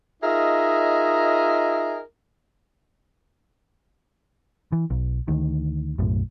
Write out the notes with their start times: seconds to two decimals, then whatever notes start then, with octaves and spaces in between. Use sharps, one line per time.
0.23 D#4 F4 G#4 A#4 D#5 E5
4.72 E3
4.90 B1
5.28 D2 D#3
5.99 B1 F#2 A2